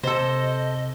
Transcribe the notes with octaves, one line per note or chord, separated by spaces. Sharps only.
C3 A4 C5 D#5